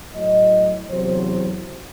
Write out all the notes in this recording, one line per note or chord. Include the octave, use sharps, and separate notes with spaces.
A2 F#3 D#5
E2 C3 F#3 C5